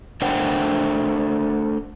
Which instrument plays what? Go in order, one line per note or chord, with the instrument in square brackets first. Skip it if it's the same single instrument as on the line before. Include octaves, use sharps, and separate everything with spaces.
[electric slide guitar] A3 D4 A#4 C5 F#5 G5